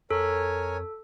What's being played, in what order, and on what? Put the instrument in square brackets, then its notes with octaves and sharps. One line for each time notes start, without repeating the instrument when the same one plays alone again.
[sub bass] F2 [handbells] A4 [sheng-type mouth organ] A#4 C#5 G#5